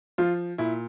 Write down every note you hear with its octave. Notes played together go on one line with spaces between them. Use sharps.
F3 F4
A#2 E4